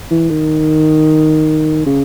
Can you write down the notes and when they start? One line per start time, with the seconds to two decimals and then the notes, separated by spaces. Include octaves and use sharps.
0.11 E3
0.30 D#3
1.86 C#3